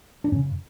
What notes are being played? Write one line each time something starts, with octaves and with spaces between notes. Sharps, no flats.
D4
F#2 C#3 C#4